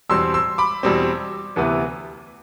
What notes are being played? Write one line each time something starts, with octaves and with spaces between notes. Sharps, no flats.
E2 B2 G3 C4 C6 E6
C6 E6
B5 D6
E2 B2 G3 C4
D2 C3 E3 B3 E4